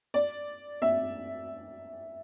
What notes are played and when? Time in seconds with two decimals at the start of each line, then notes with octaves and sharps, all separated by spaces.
0.14 D5
0.82 E5